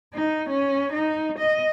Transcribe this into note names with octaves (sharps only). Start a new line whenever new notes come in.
D#4
C#4
D#4
D#5